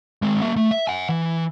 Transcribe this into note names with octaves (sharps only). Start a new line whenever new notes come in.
G#3 C4
A#3 E5
A3
E5
F#5 G#5
E3